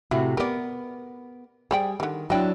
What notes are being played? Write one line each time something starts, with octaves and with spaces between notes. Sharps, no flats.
A2 C3 E4 F#4
B3 G4 A#4 D5
G3 G#4 C5 D5 G5
D3 D#3 G3
F#3 D4 E4 D#5 G5